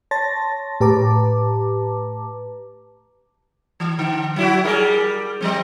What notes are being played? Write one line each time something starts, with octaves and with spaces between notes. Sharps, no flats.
C#5 A5 C6 A6 A#6
A2 G4 B4 A5 A#5 D6
E3
D3
F#3 E4 F#4
G3 G#4 A#4
F3 G3 C4